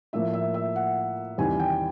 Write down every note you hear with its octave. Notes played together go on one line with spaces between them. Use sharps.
A2 F3 A#3 E5
E5
E5
F#5
E2 C3 D#3 G3 G#5
G5